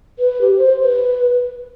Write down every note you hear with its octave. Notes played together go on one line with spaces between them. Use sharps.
B4
G4
C5
B4